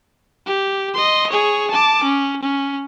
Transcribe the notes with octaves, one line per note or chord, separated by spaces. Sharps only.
G4
D#5 C6
G#4 C#5
A5 D6
C#4
C#4